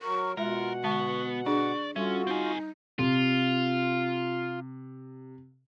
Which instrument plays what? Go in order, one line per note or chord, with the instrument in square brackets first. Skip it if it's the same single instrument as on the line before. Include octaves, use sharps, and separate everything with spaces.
[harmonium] F#3 A#4 [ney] C#6
[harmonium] B2 F#5 [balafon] G#3 E5 [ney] F4 [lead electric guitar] A#4
[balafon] D3 G#3 A5 [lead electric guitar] B3 [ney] C#6
[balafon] D4 G#4 [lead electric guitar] D5 [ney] C#6
[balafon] G3 [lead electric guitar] C#4 [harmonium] F4 F#4 [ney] A4
[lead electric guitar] C4 G#4 [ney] D#4
[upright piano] C3 [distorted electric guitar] F4